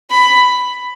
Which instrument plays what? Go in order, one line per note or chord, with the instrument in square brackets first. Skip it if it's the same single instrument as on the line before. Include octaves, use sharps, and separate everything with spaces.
[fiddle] B5